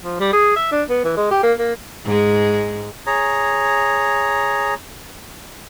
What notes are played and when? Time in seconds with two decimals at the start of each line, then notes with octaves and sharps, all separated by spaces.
0.04 F3
0.20 G3
0.33 G#4
0.56 E5
0.72 D4
0.90 B3
1.04 E3
1.17 G#3
1.31 G4
1.43 A#3
1.59 A#3
2.04 G#2 G#3
3.07 G#4 C#5 A#5